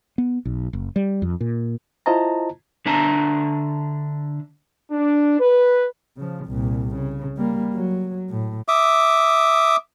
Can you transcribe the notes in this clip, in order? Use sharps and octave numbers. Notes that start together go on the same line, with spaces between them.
B3
B1
F#1
G3
F2
A#2
E4 F4 C5 D#5 A5 A#5
D3 D4 E5 A5 A#5
D4
B4
C#3 F3
C2 A#2
C#3
G3 A#3
F#3
A2
E5 D6 D#6